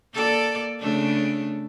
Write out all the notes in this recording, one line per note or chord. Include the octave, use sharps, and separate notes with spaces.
A#3 A4 D5
C#3 A3 D4